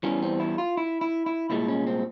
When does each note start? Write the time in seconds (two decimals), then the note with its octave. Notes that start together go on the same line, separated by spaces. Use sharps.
0.03 E2 E3 G3 C#4
0.22 C4
0.40 E4
0.58 F4
0.77 E4
1.01 E4
1.26 E4
1.50 C2 A#2 G#3 E4
1.68 C#4
1.87 C4